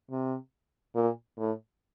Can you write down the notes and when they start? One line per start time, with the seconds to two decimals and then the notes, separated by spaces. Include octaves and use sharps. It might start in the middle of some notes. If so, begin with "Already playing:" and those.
0.11 C3
0.95 A#2
1.38 A2